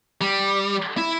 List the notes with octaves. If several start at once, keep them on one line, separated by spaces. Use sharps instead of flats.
G3
E4